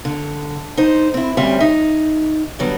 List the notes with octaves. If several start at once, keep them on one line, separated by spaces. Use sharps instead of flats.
D3
D#4 C5
C4 E4
D2 G3 C4 C#4 G4 E5
D#4
D3 F#3 G3 B3